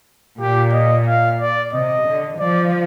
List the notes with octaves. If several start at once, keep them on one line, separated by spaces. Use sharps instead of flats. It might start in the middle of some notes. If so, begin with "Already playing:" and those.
A#2 G4
D#5
F5
D5
C3 D#5
D3
F3 D5